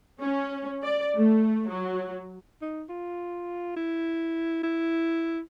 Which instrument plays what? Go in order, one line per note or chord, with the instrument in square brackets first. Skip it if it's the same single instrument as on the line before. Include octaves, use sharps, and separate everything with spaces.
[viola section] C#4
D5
A3
F#3
[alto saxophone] D#4
F4
E4
E4